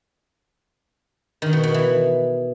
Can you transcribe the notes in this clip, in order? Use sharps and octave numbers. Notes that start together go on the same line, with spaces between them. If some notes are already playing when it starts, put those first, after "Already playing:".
D#3
B2
B2
E3